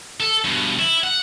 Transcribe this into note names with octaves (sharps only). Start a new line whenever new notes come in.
A4
G2 B2
E4
F#5